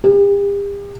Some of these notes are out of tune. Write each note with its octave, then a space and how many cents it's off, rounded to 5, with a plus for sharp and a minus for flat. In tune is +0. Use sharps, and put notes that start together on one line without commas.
G4 +40